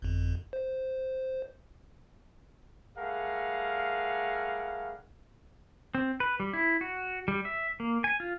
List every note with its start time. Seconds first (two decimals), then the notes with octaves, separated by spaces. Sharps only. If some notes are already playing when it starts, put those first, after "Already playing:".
0.02 G1 F2
0.53 C5
2.98 G3 A3 G#4 A#4 F5 F#5
5.95 C4
6.20 B4
6.40 G3
6.54 E4
6.81 F#4
7.28 G3
7.45 E5
7.80 A#3
8.04 G#5
8.20 F4